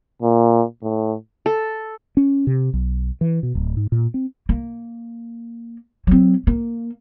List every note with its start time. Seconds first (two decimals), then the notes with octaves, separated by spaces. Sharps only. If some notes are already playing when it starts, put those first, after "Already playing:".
0.22 A#2
0.83 A2
1.46 A4
2.17 C#4
2.47 C3
2.73 B1
3.21 E3
3.43 B2
3.55 D1
3.77 G#2
3.92 A#2
4.14 C4
4.49 A#3
6.07 F#3 C4
6.47 A#3